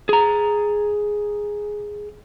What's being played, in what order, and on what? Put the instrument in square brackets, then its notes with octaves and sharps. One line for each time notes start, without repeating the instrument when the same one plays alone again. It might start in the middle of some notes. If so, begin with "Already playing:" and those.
[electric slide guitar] G#4 A#5